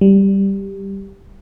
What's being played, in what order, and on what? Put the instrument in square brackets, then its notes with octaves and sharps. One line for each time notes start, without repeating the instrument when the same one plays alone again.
[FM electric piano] G3